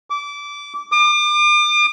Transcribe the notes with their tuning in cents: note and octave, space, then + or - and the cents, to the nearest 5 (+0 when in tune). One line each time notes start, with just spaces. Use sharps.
D6 -20
D6 +40